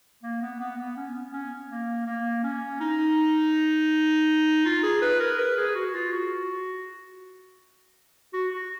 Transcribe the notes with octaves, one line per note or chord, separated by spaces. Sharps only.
A#3
B3
B3
B3
C#4
B3
C#4
A#3
A#3
C#4
D#4
F4
G#4
B4
A#4
B4
G#4
F#4
F4
F#4
F#4
F#4